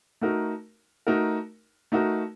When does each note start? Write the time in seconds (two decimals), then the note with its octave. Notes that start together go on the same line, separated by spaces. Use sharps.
0.21 A3 D#4 F#4 A#4
1.07 A3 D#4 F#4 A#4
1.92 A3 D#4 F#4 A#4